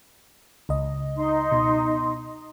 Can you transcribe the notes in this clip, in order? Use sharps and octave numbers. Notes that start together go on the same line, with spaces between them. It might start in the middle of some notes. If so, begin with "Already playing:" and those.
C#2 D#5
D#4 C6
B2